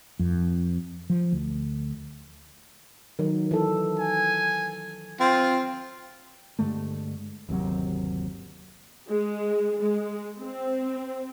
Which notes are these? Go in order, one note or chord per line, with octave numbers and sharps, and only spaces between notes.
F2
F3
D2
D#3 F#3
E3 A4
G#5
C4 F4
G2 D3 G#3 A3
G1 D#2 C3 F#3
G#3
G#3
C4